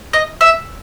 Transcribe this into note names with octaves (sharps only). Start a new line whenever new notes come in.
D#5
E5